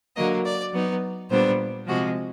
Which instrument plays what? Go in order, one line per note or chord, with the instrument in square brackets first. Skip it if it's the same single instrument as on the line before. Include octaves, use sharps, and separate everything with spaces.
[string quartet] D3 F#3 A#3 D#5
D5
F#3 B3 D#4
A#2 G3 B3 D4 C5
C3 F3 G#3 F#4